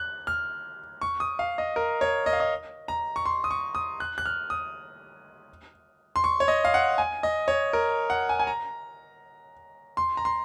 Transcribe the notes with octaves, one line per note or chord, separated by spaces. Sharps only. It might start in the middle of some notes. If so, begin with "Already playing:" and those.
Already playing: F#6
F6
C#6
D#6
F5
D#5
A#4
C#5
D#5
F5
D#5
A#5
C#6
C6
D#6
C#6
D#6
F#6
F#6
F6
D#6
C6
C#6
C#5
D#5
F5
F#5
G#5
D#5
C#5
A#4
F#5
G#5
G#5
A#5
C6
A#5
C6